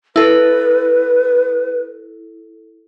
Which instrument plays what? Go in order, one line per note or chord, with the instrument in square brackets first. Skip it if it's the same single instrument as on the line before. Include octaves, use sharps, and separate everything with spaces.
[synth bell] E4 A4 [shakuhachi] B4